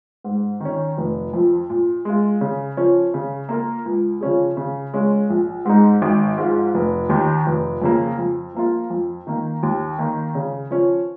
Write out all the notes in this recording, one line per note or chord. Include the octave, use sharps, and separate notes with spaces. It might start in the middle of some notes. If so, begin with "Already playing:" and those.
G#2
D#3 C#4
F1
F2 F3
A#2
G#3 F4
C#3
F3 C#4
C#3
A#3 F4 A#4
C#2
C#3 F3 C#4 G#4
C#3
G#3 C#4 F4
A#1
G#2 G#3 D#4
G#1
G#2 F3 G#3 F4
F1
D#2 D#3
F1
F2 C#3 A#3
F2
F3 A#3 F4
F2
D#3 A#3
D#2
D#3 A#3
C#3
F3 C#4